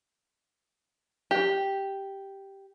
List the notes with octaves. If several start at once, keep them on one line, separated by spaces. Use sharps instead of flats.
G4